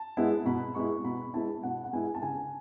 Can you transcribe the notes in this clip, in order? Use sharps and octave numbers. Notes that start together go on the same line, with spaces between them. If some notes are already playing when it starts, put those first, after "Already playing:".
Already playing: A5
G#3 B3 E4
B2 B5
G#3 B3 E4 C#6
B2 B5
G#3 B3 E4 A5
B2 F#5
F#5
G#3 B3 E4 G#5
A5
C#3 G#5